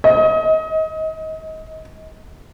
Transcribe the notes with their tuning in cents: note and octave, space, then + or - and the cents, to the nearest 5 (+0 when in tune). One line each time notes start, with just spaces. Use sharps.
D#5 +30